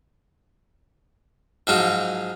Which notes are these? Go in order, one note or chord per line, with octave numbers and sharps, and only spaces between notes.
G#2 F3 F#3 D#4 F4